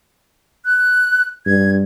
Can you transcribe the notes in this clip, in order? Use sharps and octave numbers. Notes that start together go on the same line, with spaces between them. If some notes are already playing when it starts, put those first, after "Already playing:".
F#6
G2 G#6